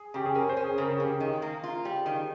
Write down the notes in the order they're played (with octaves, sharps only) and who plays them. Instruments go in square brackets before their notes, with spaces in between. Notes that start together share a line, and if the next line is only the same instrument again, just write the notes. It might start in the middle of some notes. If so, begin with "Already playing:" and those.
Already playing: [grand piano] G#4
[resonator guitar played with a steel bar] C#3 [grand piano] G4
[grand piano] G#4
[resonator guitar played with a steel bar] C#4 [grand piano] A#4
[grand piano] C5
[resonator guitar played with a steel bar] C#4
[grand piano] G#4
[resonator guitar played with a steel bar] C#3 [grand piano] A#4
[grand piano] G#4
[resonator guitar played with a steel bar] C#3 [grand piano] G4
[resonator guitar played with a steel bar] D#3 [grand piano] G#4
[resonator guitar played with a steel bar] A#3
F4
G3
D#3